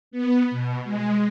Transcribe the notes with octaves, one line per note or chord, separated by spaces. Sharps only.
B3
B2
G#3